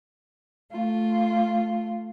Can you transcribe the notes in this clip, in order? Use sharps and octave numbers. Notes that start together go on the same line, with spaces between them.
A3 F4